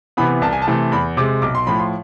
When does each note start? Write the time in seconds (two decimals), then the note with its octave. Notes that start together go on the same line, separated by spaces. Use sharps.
0.17 C3 E3 B3 B5
0.42 C2 A5
0.53 G#5
0.62 A5
0.68 C3 E3 A3
0.92 E2 B5
1.17 C3 G#3 D6
1.42 B1 D6
1.55 C6
1.67 A2 F3 B5
1.79 C6